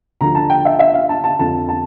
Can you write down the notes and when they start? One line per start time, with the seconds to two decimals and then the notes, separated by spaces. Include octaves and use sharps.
0.21 D2 D3 F3 A#5
0.35 A5
0.50 G5
0.65 E5
0.79 E5
0.94 F5
1.09 A5
1.24 A5
1.39 F2 D3 F3 A5
1.69 A5